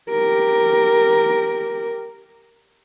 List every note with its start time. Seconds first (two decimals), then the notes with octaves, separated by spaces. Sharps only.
0.10 G4 A#4